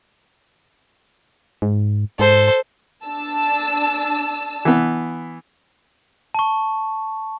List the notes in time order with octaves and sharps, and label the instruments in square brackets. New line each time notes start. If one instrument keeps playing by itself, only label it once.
[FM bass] G#2
[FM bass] G#2 [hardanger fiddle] A4 C5
[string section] D4 A5 E6
[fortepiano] E3 B3
[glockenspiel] A5 C#6